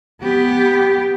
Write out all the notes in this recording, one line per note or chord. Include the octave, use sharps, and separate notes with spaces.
B3 G4